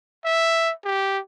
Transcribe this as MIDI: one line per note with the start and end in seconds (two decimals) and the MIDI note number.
0.25 0.72 76
0.84 1.19 67